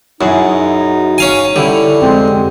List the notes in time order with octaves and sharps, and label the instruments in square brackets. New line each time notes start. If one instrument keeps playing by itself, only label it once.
[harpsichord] F#2 [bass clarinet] D#4 [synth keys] E4 F#4 G#4
[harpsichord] C#4 F5 G#5
[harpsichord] D3 [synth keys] G3 C#4 E4
[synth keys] F2 C3 G#3 [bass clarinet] C4